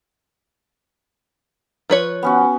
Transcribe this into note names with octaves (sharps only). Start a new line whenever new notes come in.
F3 B4 C#5
B3 C#4 F#4